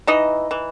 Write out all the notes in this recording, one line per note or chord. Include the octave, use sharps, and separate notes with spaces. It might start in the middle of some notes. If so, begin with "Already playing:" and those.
E3 D#4 D#5
E3